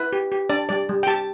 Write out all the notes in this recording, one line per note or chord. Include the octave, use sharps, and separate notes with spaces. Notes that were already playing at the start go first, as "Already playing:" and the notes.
Already playing: E4 B4
G4
G4
D4 D5
G3 D5
G3
G5
G4 A5